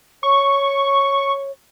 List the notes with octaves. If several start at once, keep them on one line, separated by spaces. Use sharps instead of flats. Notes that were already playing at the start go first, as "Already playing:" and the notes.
C#5 C#6